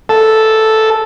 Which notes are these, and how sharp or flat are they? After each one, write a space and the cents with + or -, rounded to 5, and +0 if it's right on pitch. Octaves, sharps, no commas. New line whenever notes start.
A4 -5